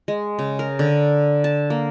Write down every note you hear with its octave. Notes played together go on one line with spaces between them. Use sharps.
G#3
C#3
A#4
D3
A5
A#3